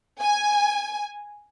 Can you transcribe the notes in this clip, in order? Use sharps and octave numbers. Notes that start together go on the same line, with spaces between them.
G#5